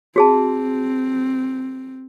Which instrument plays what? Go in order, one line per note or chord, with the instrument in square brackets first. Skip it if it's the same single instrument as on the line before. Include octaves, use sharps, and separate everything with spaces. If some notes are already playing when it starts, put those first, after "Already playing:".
[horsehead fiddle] C4 [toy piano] F#4 G#4 A5